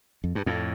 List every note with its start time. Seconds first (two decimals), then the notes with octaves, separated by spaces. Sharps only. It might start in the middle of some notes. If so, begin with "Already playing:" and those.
0.24 F2
0.35 G2
0.46 F2 A2